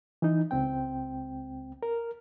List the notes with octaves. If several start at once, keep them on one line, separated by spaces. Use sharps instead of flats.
E3 D#4
C#2 C4 G5
A#4